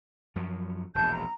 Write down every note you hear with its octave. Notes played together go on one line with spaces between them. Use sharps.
F#2 F3 F#3
E1 A#1 A5 G6
A#5